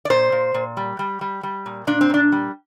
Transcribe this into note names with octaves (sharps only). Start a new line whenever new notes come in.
D5
A#2 C5
A#2
A#2
G3
G3
G3
G3
A#2
A#2 D4
C4
A#2 D4
G3